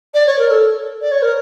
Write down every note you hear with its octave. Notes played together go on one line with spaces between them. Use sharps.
D5
C#5
A#4
A4
D5
C#5
A#4